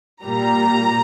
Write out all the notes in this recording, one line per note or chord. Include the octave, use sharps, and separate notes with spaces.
A#2 G3 A#3 A#5